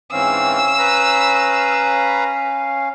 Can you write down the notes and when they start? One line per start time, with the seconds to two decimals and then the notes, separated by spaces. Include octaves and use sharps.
0.12 G#2 E3 C4 C#4 F5 E6
0.79 B4 A#5